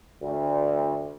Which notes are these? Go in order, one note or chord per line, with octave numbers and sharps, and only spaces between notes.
D2